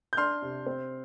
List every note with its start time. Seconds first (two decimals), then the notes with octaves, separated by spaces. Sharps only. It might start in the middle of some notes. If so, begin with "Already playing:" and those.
0.13 G6
0.17 D4 C6 F6
0.42 C3
0.66 C4